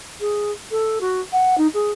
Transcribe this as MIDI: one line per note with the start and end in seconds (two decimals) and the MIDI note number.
0.20 0.51 68
0.71 0.99 69
1.01 1.21 66
1.32 1.55 78
1.57 1.67 63
1.74 1.91 68